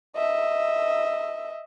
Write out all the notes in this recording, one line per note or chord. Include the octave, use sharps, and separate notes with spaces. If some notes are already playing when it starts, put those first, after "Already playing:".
D#5 E5